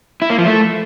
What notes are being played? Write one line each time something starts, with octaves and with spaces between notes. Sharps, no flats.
E4
A#3
F3
A3